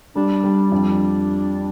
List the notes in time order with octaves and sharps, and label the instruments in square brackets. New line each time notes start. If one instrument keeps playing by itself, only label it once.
[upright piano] G3 [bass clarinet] D4
[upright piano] G3
[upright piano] F2 [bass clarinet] D4